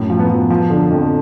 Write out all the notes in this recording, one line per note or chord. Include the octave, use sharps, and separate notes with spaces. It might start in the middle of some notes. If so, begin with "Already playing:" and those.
Already playing: F#2 A2
F3
B3
F3
F3
D3
F2